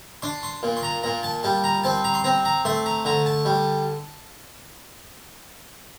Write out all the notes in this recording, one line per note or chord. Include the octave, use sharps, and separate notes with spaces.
D4 C6
C6
A#2
C6
A#5
A#2 A#5
A5
G3 A5
A#5
C4 A5
A#5
C6
C4 A#5
A#5
A3 C6
A#5
D3 A#5
A5
G3